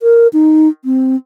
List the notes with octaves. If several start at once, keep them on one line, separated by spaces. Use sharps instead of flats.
A#4
D#4
C4